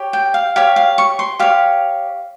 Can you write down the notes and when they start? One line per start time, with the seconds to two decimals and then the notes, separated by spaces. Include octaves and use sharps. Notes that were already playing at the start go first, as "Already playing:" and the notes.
Already playing: G4 C#5
0.13 G5
0.34 F5
0.56 G4 C#5 F5
0.76 F5
0.98 C#6
1.19 C6
1.39 G4 C#5 F5